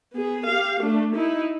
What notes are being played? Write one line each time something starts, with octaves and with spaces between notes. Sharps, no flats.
B3 G#4
G4 F5
A3 D4
D#4 E4